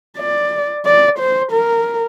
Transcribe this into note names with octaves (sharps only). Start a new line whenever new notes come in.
D5
D5
C5
A#4